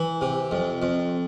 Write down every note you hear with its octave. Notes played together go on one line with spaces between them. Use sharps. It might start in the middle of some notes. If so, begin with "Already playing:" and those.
Already playing: E3
C3
F2
F2